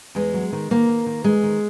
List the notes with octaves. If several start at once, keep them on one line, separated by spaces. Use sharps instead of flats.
E2 G#3
F#3
D#3
D#3 A#3
D#3
D#3
E2 G#3
D#3